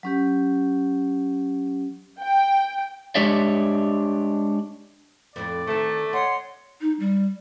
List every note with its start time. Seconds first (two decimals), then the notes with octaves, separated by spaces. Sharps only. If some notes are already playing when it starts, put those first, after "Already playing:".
0.03 F#3 C#4 G4
2.20 G5
3.15 G#3 D4 G4 C#5 D5 E5
5.36 F2 A2 D5
5.67 D2 D#3 A3
6.13 C#5 D#5 F#5 C6
6.81 D#4
7.00 G3